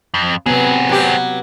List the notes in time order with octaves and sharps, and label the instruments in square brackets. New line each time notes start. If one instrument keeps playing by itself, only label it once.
[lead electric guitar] F2
[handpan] C3 B3 [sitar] F#3 [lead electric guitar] C4 G#4
[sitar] F#3 G4